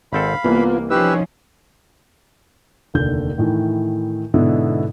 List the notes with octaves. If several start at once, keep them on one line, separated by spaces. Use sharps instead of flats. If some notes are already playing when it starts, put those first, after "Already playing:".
G#1 C4 A4 F5 B5
C2 E3 A#3 B3 F4
F3 C#4 D#4 G4 B4 E6
F1 D#2 D3 G6
A2 D#3 E3
G#2 B2 D3 B3 E4